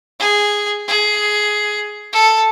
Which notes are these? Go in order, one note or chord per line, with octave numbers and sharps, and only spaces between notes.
G#4
G#4
A4